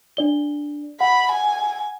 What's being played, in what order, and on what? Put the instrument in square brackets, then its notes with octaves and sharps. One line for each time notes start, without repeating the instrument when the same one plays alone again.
[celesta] D4 D5 G7
[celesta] F#5 [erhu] B5
[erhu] G#5